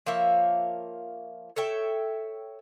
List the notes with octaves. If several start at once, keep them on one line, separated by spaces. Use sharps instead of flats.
F3 A#3 C#5 E5
A4 C#5 E5 G5